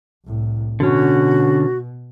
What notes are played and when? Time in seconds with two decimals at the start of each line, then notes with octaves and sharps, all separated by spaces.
0.25 C2 A2
0.80 B2 D3 C#4 F#4